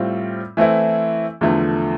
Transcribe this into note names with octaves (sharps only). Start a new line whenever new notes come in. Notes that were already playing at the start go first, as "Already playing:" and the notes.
Already playing: A2 G3 C4 F4
E3 A3 C4 E4
E2 D3 F3 A3